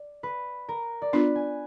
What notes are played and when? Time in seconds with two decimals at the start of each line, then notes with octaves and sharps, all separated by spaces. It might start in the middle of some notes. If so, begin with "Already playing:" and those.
Already playing: D5
0.23 B4
0.68 A#4
1.02 D5
1.13 B3 D4 F4 B4
1.35 G#5